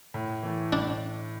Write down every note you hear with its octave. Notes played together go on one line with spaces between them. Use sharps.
A2
E3 A3
A2 D4